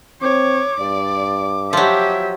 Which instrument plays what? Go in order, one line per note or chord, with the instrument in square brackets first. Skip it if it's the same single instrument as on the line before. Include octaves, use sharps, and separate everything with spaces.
[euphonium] C4 [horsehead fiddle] C#5 [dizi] D6
[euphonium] G2 [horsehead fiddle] D5
[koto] F3 F#3 [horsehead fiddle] G4 E5